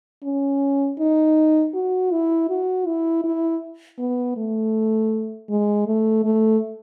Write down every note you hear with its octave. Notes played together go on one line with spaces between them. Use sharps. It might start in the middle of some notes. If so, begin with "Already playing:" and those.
C#4
D#4
F#4
E4
F#4
E4
E4
B3
A3
G#3
A3
A3